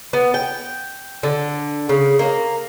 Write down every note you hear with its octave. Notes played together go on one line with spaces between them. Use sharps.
B3
G5
D3
C#3
A#3